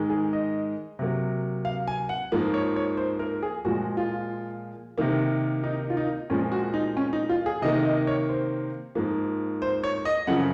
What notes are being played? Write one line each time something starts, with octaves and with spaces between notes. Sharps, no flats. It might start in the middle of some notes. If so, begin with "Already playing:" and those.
Already playing: G#2 D#3 G#3
G#4
D#5
C3 F#3 A#3
F5
G#5
F#5
G#2 F3 A#3
C#5
C#5
C5
A#4
G#4
A#2 F3 G#3 F#4
F4
C3 D#3 A#3
D#4
F4
D#4
A#2 F3 G#3 C#4
F#4
D#4
C#4
D#4
F4
G#4
C3 D#3 A#3 D#5
D#5
C#5
C5
G#2 F3 A#3
C5
C#5
D#5
F#2 C#3 F3 F#5